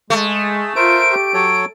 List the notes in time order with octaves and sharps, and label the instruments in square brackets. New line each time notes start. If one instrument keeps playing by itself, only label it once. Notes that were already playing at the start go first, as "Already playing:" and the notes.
[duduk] G#3 [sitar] A3
[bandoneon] G#4
[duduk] F4 [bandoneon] A#4 C5 E5 [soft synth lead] D7
[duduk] G4
[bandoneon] F#3 A4 C#5